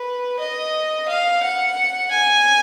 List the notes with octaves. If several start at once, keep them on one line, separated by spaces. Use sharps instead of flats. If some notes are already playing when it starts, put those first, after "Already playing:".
Already playing: B4
D#5
F5
F#5
G#5